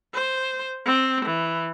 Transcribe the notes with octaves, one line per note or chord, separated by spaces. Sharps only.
C5
C4
E3